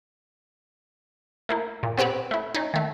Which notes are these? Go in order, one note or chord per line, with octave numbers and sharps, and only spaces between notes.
A3 A#3 E4
A#2
B3 C4 G4 B4 C#5
A3 E4
C#4 D#4
D#3 A3